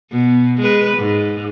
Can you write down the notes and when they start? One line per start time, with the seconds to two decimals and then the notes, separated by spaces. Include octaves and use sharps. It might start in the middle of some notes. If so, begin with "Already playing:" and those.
0.12 B2
0.61 G#3 B4
0.97 G#2